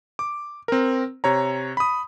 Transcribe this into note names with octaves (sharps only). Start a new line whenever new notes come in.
D6
C4 A#4
C3 C#5 A#5
B5 D#6